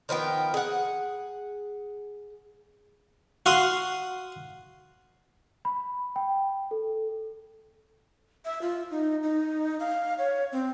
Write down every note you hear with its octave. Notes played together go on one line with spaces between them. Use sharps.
D#3 F3 B3 G5
G#4 F#5
F#4 F5 C6 D#6
B5
G5
A4
E5
F4
D#4
D#4
F5
C#5
C4